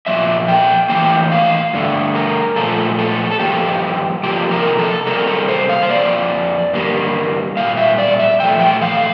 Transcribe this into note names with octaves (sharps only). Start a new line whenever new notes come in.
A#2 F3 A#3 E5
G5
A2 E3 A#3 G5
F5
G2 D3 A3
A#4
A#2 F3 A3 A4
A4
A4
G2 F3 A#3 G4
C3 F3 A#3 G4
A#4
A4
C3 G3 A#3 A#4
A4
C5
F5
C5
F2 E3 A#3 D5
G2 D3 G3 A#3
A#2 G3 F5
E5
D5
E5
A#2 F3 A3 G5
G5
F5